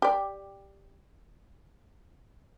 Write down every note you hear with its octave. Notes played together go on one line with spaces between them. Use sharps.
G4 D5